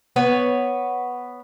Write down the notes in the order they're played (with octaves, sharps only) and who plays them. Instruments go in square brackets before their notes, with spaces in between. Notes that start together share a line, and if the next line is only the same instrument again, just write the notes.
[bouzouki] B3 B4 C#5